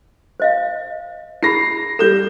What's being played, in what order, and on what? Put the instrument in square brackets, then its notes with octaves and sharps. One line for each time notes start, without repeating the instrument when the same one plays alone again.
[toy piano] C5 D#5 F5
[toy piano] E4 G#4 B5 [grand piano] A#6 C7
[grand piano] G3 G6 E7 [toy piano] A4